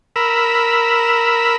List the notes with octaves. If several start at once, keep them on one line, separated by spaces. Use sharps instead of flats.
A#4 B5 E6